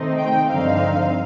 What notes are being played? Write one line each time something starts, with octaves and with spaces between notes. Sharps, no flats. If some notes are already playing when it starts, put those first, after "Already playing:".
Already playing: C3 D#3 A3 C4 D#4
G5
G2 D3 F3 C4 D#4 F5